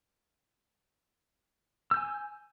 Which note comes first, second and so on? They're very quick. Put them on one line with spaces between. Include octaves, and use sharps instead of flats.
E6 G6 G#5